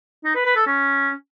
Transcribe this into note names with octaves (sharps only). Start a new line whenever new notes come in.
D#4
B4
B4
A4
C#4